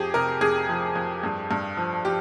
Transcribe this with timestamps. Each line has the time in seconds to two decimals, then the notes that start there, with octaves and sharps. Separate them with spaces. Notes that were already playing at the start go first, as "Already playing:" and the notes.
Already playing: F2 F3 G4 G#4
0.14 C3 A#4
0.41 F2 G#4
0.69 F3
0.95 F2
1.23 G2
1.51 G2
1.77 F3
2.05 F3 G4